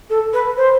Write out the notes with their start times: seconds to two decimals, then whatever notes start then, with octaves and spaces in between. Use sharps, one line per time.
0.09 A4
0.33 B4
0.57 C5